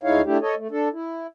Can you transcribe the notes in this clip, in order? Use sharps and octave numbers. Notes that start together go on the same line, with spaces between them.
D2 G#3 D#4 E4 C#5 F5
A3 D4 E4 G4
A4 C#5 D#5
A3
D4 A4
E4